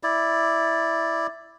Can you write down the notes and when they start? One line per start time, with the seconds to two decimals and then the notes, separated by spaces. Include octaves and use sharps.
0.03 E4 D5